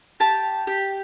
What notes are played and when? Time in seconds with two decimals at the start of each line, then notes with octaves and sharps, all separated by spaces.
0.20 G4 A5
0.67 G4